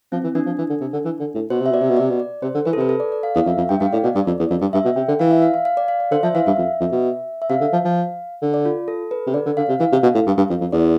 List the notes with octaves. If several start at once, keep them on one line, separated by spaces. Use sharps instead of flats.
F3 C4
E3
E3 D4
F3
E3
D3
C3
D3
E3
D3
A2
B2 C5
C3
E5
B2 D5
C3
B2
C3 D5
B2
D5
C3 C5
D3
E3 B4
A4
C3 B4
A4
D5
D5
F5
E2 F5
F2 E5
F2
G2 G5
G2 F5
A2 D5
B2 D5
G2 D5
F2
E2
F2
G2
G2 E5
B2
C3 G5
D3
E3 F5
E5
F5
F5
F5
D5
F5
D5
D3 C5
F3 E5
E3 F5
G2 E5
F2
F2
B2
E5
C3 F5
D3
F3
F3
D3
D5
F4
A4
B4
C3
D3 D5
D3
D3 F5
C3
E3 F5
C3
B2
A2
G2
G2
F2
F2
E2 D5